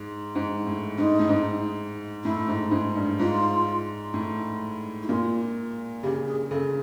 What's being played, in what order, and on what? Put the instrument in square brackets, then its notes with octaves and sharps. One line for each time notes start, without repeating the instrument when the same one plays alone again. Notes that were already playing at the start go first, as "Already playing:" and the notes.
Already playing: [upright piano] G#2
G#2
A2
[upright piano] G#2 [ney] D#4
[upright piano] A2
G#2
[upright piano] A2 [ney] E4
[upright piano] G#2
G#2
G2
[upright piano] G#2 [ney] F4
[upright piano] A2
[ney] E4
[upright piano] A#2 [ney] F4
[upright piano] C#3 [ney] G4
[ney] G#4
[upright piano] C#3 [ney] A4